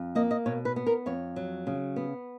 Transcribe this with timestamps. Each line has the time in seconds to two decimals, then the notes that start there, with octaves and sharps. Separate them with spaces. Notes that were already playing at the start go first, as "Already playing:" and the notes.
Already playing: F2
0.15 A#3 D#5
0.31 D#5
0.46 B2 C#5
0.65 B4
0.76 B3
0.87 A#4
1.06 F2 C#5
1.36 F#3
1.67 C#3
1.96 B3